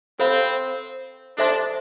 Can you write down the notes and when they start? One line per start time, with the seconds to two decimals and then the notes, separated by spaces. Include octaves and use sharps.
0.19 C4 A4 C5 F5 B5
1.38 D4 A4 C5 E5 A5 C6